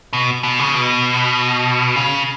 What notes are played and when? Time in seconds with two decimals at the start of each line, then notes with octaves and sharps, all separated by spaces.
0.13 B2
0.44 B2
0.59 C#3
0.75 B2
1.96 C#3